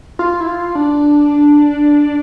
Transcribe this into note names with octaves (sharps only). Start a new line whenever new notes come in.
F4
E4
F4
D4